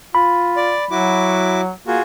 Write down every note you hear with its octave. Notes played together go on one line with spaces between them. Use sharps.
F4 B5
D5
F#3 E4 F#4 D6
A#3 F4 F#4 G#4